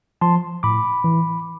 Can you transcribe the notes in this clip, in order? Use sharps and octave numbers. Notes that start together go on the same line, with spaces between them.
F3 A5 C6
A2 B5 D6
E3